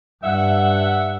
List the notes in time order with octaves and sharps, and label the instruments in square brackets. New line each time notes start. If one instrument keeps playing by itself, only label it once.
[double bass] G2 [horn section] E5 F#5